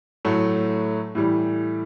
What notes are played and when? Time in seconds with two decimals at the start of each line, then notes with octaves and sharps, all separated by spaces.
0.25 A2 F#3 A3
1.15 A2 E3 G3